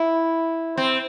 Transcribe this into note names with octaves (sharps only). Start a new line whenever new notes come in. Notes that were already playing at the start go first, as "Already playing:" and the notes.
Already playing: E4
C4